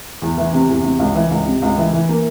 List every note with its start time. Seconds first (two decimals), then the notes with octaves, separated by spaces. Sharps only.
0.22 E2
0.38 E3
0.53 C3
0.69 E2
0.84 C3
0.99 C#2
1.15 E3
1.31 C#2
1.46 C3
1.62 C#2
1.78 E3
1.93 E3
2.09 A#3